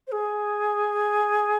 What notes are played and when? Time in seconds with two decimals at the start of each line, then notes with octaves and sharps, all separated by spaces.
0.07 C5
0.12 G#4